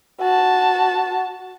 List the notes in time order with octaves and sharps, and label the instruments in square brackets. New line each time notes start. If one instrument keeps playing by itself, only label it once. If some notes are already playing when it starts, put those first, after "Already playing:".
[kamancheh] F#4 A5